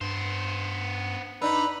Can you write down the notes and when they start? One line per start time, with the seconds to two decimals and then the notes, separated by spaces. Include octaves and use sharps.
0.01 G2 B3 C5
1.41 D4 D#4 B4 A#5 B5 E6